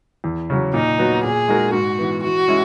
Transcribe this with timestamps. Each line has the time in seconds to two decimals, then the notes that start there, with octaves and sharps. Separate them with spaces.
0.24 E2
0.50 C#3 F#3
0.74 A#2 D#4
0.99 F#3 B3 F#4
1.24 A#2 G#4
1.48 G#3 D#4 F#4 A#4
1.73 G#2 F#4
1.98 E3 B3
2.23 E3 F#4
2.48 G#3 C#4 E4